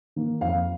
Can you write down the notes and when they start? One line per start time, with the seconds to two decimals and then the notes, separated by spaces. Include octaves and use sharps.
0.16 D#3 A#3
0.41 F2 F5